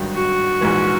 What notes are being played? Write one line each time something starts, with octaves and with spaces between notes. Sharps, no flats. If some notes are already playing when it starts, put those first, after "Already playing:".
Already playing: G#1 G2 D#3 F#3
F#4
A#1 G#2 E3